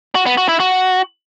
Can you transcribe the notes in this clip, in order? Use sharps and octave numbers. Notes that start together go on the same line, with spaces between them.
F#4
B3
F#4
E4
F#4